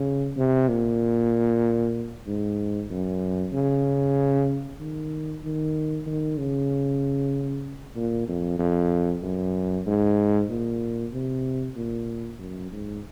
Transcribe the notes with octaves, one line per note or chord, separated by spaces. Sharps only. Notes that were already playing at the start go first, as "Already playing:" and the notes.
Already playing: C#3
C3
A#2
G#2
F#2
C#3
D#3
D#3
D#3
C#3
A#2
F2
F2
F#2
G#2
A#2
C3
A#2
F#2
G#2